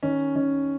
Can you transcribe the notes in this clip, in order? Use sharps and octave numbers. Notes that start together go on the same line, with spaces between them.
D#3 C#4
D#3 C#4